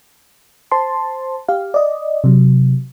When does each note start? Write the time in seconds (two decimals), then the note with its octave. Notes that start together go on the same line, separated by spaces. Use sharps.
0.71 C5 A5 C6
1.48 G4 F5
1.74 D5 D#5
2.24 C3 F#3